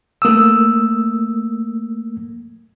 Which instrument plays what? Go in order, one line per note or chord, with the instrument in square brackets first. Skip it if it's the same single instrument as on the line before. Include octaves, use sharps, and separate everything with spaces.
[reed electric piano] A3 A#3 D#6 E6